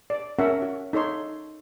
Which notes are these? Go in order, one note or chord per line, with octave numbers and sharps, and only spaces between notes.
D5
C#4 F#4 A#4 C#5 E5 F#5
F#4
D#4 A4 C#5 C6